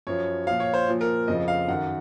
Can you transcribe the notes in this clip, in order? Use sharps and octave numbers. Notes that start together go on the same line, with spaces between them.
F#2 F3 C#5
A#2 F3 F5
C#5
C5
A#2 F3
A#4
F2 C#3 F3 D#5
F5
F#2 D#3 F#5